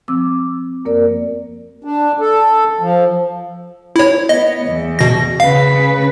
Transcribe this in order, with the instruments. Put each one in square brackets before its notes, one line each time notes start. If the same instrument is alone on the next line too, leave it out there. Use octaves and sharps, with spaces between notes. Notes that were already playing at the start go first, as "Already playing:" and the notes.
[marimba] F3 C4 D6 E6
F#2 A#3 A#4 D5
[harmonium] D4
A4
F3
[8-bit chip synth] E4 C#5
[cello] B3 [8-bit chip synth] D#5
[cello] E2
[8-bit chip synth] B2 A#6
[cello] C#3 B4 [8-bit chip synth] F5